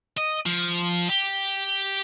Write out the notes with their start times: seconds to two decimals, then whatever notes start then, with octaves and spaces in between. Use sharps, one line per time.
0.17 D#5
0.46 F3
1.09 G4